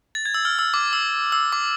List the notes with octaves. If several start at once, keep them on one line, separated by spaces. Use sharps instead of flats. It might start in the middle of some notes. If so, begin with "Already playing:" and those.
A6
G#6
E6
F6
E6
D6
E6
E6
D6